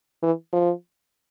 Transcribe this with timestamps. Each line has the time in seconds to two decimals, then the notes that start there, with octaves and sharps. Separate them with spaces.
0.23 E3
0.53 F3